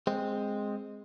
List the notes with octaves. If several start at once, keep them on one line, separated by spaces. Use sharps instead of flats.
G#3 C4